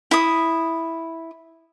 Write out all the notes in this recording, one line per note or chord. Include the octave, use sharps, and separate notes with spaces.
E4 D#6